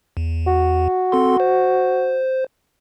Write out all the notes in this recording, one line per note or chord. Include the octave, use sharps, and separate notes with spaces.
E2
F#4
C4 A4 C6
C5